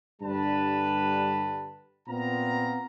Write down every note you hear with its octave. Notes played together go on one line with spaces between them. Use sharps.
G2 D3 G3 B4 A5
A#2 B3 C4 F5 A#5